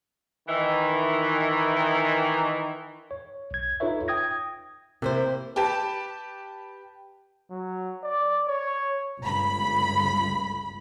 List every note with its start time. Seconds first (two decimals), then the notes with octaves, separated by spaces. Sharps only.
0.48 D#3 E3
3.11 C#5
3.51 B1 G#6
3.80 D#4 F4 A4 B4 C#5 E5
4.08 G5 D#6 G#6 A#6
5.02 C3 A#3 E4 C5
5.56 G4 B4 A5
7.50 F#3
8.04 D5
8.48 C#5
9.20 G1 C#2 B5